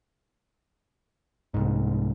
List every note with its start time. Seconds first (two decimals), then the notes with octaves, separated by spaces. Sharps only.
1.54 C2 G#2